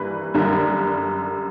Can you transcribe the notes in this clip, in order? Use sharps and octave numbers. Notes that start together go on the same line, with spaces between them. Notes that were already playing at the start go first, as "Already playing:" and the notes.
Already playing: G2 E3 G3 A#3 B4
F#2 D3 G3 A#3